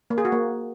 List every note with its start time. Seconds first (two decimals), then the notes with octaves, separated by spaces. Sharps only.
0.10 A#3
0.18 G#4
0.25 F#4
0.32 A#3